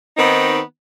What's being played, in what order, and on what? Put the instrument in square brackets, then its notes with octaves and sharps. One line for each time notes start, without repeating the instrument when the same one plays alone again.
[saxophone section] D#3 B3 C4 D#4